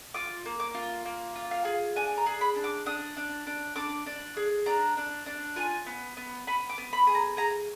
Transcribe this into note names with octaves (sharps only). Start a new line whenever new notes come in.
F4 D6
A#3
D6
F4
A#3
F4
F5
G#4
D4 G#5
A#5
G#4
B5
D4
D6
D4 D#6
D4
D4
D4 D6
D4
G#4
D4 A#5
D4
D4
F4 G#5
B3
B3
B3 B5
D6
B3
B5
G#4
A#5
G#4 A#5